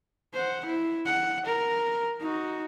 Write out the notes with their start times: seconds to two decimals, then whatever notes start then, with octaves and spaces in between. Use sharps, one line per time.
0.33 C5 F#5
0.66 E4
1.06 F#5
1.46 A#4
2.20 D#4 F#4